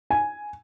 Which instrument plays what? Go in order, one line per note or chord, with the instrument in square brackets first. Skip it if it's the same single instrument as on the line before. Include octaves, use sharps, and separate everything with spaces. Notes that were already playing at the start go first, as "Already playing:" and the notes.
[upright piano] G#5